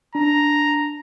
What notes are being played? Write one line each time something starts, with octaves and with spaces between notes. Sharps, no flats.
D4 A#5